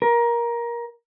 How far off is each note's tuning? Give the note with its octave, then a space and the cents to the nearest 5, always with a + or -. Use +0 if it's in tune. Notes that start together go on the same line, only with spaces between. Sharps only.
A#4 +20